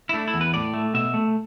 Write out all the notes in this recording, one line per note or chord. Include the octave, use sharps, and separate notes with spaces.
E4
A3 D4
E4
E2
B4
A2 D5
A3
B2 E5
A3